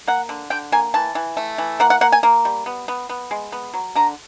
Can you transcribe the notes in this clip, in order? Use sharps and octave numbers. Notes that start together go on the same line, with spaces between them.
A#3 F#5
D3
D3 G5
A#3 G#5
E3 A5
E3
A3
E3
A#3 F#5
F#5
A#3 F#5
G#5
A#3
G3
B3
B3
B3
G#3
B3
F#3
D3 A#5